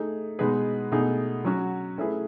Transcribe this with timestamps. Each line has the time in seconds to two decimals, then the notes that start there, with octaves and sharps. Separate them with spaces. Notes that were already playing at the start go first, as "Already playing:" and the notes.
Already playing: A3 D#4 G#4
0.39 B2 G#3 D#4 G#4 B4
0.92 B2 A3 D#4 G#4
1.45 F#3 C#4 F#4
1.98 A3 C#4 E4 G#4 B4